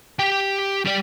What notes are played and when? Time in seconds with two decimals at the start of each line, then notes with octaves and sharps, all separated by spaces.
0.19 G4 G5
0.85 G3 D5